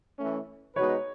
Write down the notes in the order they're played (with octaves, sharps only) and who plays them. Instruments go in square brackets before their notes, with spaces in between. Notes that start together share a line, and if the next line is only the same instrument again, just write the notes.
[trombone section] E3 A3 C#4
[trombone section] B2 G#3 D#4 F#4 B4 [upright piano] C#5